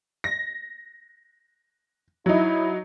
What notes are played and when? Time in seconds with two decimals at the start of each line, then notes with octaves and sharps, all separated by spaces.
0.24 A#6
2.26 F#3 D#4 E4